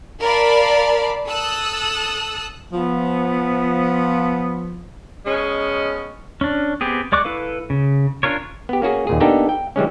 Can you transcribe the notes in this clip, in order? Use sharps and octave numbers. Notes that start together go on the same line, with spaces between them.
A#4 D5 F5 A5 B5
A4 D#6 E6 F#6
F3 B3
B2 G#3 C#4 D#5
C#4 D4
B3 C4 G4 G#4
G#3 D5 C#6 D6 F#6
E4 A4 B4 F5
C#3
C#4 D4 F4 A#4 C#5
B3 G4
A#3 C#4 F#4 G#4
D#2 A#2 G#4
A#3 B3 D4 D#4 G4 A4
G5
E3 G3 G#3 C#4